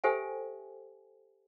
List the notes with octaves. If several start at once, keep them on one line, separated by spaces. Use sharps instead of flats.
G4 A4 C5 E5 G5 G#5